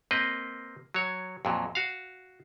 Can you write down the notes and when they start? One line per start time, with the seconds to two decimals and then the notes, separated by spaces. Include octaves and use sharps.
0.11 A#3 C4 B4 D#5
0.94 F#3 C#5
1.45 F2 A#2 F#3
1.75 F#4 F5